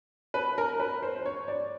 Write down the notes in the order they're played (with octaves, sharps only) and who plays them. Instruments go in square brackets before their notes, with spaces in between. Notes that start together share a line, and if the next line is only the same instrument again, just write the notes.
[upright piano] B4
A#4
B4
C5
C5
C#5
D5